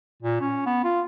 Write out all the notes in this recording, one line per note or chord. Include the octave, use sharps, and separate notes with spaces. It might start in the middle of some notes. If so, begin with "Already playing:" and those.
A#2
C#4
B3
F4